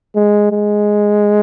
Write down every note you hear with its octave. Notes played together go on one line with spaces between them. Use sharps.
G#3
G#3